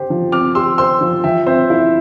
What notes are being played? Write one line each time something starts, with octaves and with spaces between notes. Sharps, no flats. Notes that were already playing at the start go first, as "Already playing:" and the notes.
Already playing: G4 C5
F3
C4 D6 F6
G4 C6 E6
C5 C6 E6
F3
F3 E5 G5
C4 C5 E5
E4